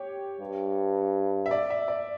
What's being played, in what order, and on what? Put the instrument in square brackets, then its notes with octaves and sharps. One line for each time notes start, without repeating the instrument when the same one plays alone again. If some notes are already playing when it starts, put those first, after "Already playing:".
Already playing: [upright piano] G4 C#5
[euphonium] G2
[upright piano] E5
D5
E5
D5